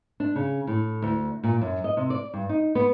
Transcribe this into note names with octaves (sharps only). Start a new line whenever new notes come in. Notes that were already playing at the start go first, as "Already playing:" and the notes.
D4
C#3
A2
D2
A#2
F#2
D#5
C3
D5
G2
D#4
B3